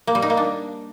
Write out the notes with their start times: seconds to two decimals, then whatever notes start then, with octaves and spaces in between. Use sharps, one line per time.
0.07 A#3
0.15 G3
0.22 D#4
0.30 A#3
0.37 D4